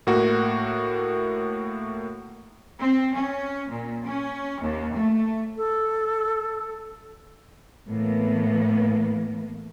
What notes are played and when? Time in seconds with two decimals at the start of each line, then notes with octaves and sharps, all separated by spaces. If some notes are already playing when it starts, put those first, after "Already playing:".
0.07 A2 A#3 F#4
2.80 C4
3.15 C#4
3.70 A#2
4.06 C#4
4.61 D#2
4.95 A3
5.57 A4
7.88 A2 E3 A#3 B3